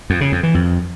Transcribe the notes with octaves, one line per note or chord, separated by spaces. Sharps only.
F2
C#3
F2
E3
F2